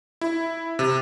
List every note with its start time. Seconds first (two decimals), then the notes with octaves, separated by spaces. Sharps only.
0.21 E4
0.79 C3